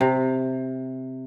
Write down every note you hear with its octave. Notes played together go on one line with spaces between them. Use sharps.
C3